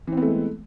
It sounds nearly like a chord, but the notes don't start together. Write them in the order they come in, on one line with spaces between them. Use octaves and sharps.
E3 C4 B3 A3 G#3